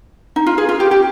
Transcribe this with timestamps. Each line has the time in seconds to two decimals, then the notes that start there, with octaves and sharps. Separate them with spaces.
0.36 D#4
0.46 F4
0.58 G#4
0.69 F4
0.80 G4
0.91 G4